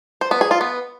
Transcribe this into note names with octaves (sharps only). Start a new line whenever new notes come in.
C5
B3
G#4
F4
B3